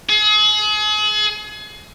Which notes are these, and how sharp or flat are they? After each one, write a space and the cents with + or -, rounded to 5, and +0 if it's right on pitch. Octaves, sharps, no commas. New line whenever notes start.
G#4 +35